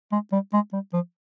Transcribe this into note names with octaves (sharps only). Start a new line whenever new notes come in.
G#3
G3
G#3
G3
F3